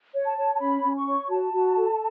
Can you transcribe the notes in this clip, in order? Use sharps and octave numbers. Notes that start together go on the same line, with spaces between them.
C#5
A5
C#5
A5
C#4 B5
C#4
C#6
C#5
F#4 A5
F#4
A4